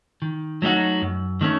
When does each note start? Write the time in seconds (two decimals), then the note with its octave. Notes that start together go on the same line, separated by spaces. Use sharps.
0.22 D#3
0.62 F#3 A3 D#4 F#4
1.02 F#2
1.41 D#3 A3 C#4